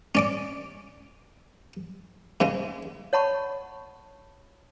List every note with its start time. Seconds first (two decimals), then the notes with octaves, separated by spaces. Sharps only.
0.15 C#4 D5 D6
2.40 G#2 C#3 G#3
3.13 C#5 F#5 A5 B5 C#6